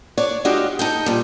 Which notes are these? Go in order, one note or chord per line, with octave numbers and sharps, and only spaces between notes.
D4 C#5 D5
G#3 D4 F#4 G4 D#5 F5
D#4 A4 G5
A#2 G3